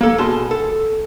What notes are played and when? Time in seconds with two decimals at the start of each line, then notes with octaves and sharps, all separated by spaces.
0.01 A#3 A4
0.18 B2 G#4 A5 C6
0.51 A4